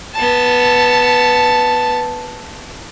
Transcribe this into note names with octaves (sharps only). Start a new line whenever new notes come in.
B3 A5